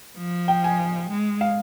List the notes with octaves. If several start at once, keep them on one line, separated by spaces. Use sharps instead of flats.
F3
G5
G#5
G#3
F5